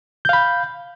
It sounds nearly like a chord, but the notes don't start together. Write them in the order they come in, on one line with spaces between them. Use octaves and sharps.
G6 F5 B5